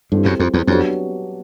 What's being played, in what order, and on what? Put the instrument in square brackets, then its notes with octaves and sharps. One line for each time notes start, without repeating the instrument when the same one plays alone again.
[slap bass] G2 [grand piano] G3 C4 E4 A4 C5
[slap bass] F#2
F2
E2
[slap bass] F2 [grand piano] F#3 B3 D4 G4